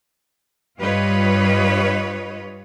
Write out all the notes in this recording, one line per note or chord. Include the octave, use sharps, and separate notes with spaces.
G2 G3 F4 B4 C#5 D#5